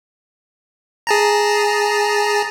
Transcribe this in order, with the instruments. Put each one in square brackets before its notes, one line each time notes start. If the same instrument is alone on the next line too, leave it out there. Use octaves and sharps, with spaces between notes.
[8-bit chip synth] G#4 A5 A#5